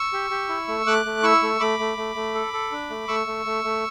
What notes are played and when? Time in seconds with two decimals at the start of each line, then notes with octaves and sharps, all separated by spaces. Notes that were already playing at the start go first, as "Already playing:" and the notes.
Already playing: C#6 E6
0.13 G4
0.30 G4
0.49 E4
0.68 A3
0.86 A3 D6 F#6
1.05 A3
1.23 E4 C#6 E6
1.42 A3
1.60 A3 B5 D6
1.79 A3
1.97 A3
2.15 A3
2.35 A4
2.53 A4
2.72 D4
2.90 A3
3.08 A3 C#6 E6
3.27 A3
3.45 A3
3.64 A3